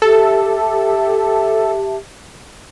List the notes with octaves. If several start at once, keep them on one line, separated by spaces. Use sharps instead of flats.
G4 A4 E5 A5